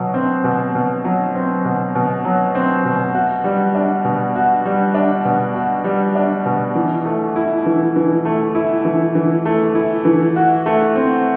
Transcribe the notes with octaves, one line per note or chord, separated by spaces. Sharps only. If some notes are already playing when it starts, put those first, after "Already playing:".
Already playing: B2 F#3
C4
B2
B2
F#3
C4
B2
B2
F#3
C4
B2
F#4
G3
D4
B2
F#4
G3
D4
B2
F#4
G3
D4
B2
E3
A3
E4
E3
E3
A3
E4
E3
E3
A3
E4
E3
F#4
A3
C4